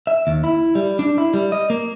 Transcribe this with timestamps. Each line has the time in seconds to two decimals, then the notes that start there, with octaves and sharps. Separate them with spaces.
0.07 E5
0.27 D#2
0.44 E4
0.75 G3
0.99 D4
1.18 E4
1.34 G3
1.52 D#5
1.70 A#3